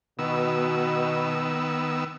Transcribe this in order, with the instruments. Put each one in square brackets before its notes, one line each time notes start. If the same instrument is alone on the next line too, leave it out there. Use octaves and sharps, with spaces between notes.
[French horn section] B2 [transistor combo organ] D#3 B3 E6